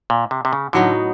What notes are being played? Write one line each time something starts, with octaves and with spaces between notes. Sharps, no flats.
A#2
C3
C3
C#3
A2 D3 F#3 B3 D#4